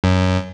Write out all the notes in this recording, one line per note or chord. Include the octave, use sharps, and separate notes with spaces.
F#2